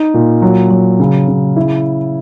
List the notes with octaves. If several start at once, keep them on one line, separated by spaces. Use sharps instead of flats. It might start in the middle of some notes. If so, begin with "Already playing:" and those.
Already playing: D#4
A#2
F#3
F#3
C#3
C#3
E4